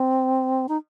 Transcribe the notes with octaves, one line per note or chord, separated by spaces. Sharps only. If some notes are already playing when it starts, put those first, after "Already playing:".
Already playing: C4
D#4